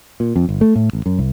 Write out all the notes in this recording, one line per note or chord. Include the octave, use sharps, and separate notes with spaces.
A#2
F2
G1
A3
A2
A1
F#2
C2